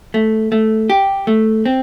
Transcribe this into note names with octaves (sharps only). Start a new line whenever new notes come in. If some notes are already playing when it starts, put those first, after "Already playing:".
A3
A3
G4
A3
C4